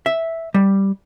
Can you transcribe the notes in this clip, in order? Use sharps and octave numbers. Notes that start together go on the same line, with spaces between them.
E5
G3